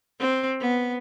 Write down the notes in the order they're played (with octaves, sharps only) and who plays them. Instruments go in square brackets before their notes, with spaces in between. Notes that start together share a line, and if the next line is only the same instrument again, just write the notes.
[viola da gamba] C4
B3